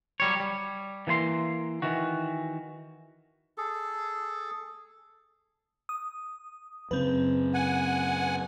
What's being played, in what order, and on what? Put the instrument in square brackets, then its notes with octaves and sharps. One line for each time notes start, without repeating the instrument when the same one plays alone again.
[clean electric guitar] F#3 G3 C#5
G3
E3 A#3 G#5 C6
D#3 E3 F#4
[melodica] G#4 A4
[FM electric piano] D#6
[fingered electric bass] F#2 C#3 [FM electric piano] C4 B4
[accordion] F#5 G#5